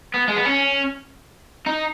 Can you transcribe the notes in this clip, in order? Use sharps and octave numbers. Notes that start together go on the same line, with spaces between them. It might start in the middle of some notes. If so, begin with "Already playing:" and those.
B3
G#3
B3
C#4
D#4